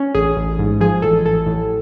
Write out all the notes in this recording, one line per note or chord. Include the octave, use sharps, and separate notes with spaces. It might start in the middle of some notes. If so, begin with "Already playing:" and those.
Already playing: C#4
A1 G#4
A1
G#2
F3 G#4
A1 A4
A1 A4
A2